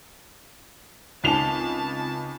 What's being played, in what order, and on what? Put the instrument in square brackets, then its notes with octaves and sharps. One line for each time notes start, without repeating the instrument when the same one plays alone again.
[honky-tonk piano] C#2 C7 F7 [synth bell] C4 D#4 G#5 [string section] A5